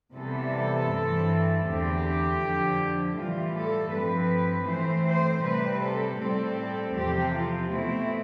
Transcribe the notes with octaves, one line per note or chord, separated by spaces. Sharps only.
C3 E3 G3 B3 A4
G2 E3 A3 C4
E2 D3 A3 C4 G4
F2 D3 F3
A2 E3 G3 F4
A4
G2 F3 C4 B4
A2 E3 A3 C4 C5
C5
C3 G3 C4 B4
A4
A2 G3 C4 A4
A4
E2 C3 F3 C4 G4
F4
B2 A3 C4 E4